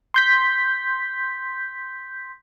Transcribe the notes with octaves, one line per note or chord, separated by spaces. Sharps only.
C6 G6 B6